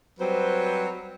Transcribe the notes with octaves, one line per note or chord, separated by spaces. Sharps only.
F#3 G3 C4 B4 C5